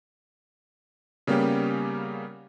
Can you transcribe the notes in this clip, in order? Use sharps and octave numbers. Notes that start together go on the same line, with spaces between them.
C#3 G3 A#3 B3 C#4 G4